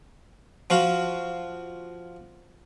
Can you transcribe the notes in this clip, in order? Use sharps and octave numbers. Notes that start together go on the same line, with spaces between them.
F3 F4 F#4